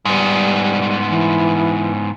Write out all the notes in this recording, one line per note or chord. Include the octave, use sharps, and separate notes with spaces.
G#2 G3 B3
E3